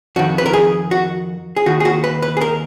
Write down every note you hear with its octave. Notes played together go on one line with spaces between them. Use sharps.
F2 D#3 F#4
B4
A#4
G#4
F#4
G#4
D#2 D#3 F#4
G#4
F#4
B4
B4
G#4
A#4